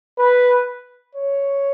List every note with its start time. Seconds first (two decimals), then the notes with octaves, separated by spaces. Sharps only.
0.18 B4
1.15 C#5